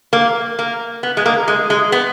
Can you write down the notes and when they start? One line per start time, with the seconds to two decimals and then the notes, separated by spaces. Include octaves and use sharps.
0.13 A#3
0.59 A#3
1.03 B3
1.17 G#3
1.26 A#3
1.48 G#3
1.70 G#3
1.92 B3